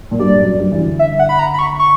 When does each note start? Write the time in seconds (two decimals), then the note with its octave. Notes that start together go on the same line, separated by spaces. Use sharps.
0.11 A#2
0.19 G2 D5
0.40 F#2
0.59 G2
0.71 E3
0.80 D3
0.99 E5
1.19 F#5
1.29 B5
1.39 A#5
1.54 B5
1.59 C#6
1.79 C#6